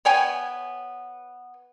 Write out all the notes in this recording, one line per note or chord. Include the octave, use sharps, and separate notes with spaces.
B3 C#5 G5 G#5